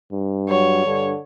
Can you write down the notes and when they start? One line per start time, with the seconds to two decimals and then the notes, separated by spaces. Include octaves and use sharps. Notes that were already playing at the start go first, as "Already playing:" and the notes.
0.12 G2
0.49 F#3 C#5
0.86 G2 D3